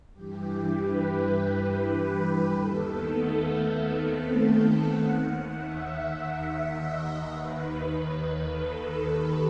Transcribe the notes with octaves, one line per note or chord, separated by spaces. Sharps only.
G2 E3 G4
B4
B4
D#2 D#3 A4
B3
A3
B3
C4
F#5
D#2 D#3
E5
E5
D#5
D#2 D#3 B4
B4
A4
G4